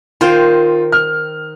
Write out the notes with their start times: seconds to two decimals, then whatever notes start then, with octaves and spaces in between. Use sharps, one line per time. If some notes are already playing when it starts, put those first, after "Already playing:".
0.21 D#3 F4 C5 G5
0.92 F6